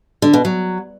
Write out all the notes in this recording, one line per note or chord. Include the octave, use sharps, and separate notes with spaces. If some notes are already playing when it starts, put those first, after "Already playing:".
D3
B2
F#3